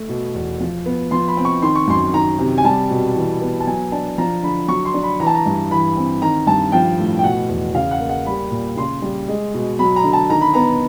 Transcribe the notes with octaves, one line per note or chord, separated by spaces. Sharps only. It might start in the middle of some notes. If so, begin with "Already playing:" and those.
Already playing: A3
B2
E2
F3
B3
F3 C6
B5
C4
C#6
D#3 C6
C#6
F#2 C6
D#3 A#5
C3
G#5
G3 A5
B2
E3
B3
A5
F#3 G#5
D4 A5
F3 A#5
D3 B5
F#3 C#6
C6
D4
B5
E3 A#5
A5
A#5
G2
E3 B5
C4
D#3 A#5
G2 A5
F3 G5
A2
G5
B2 F#5
E2
C#3 F5
F#5
A#3
F#5
G3 B5
A#2
C#3 C6
G3
G#3
B2
F#3 B5
A#5
D3
A5
D#3 A#5
B5
B3 A#5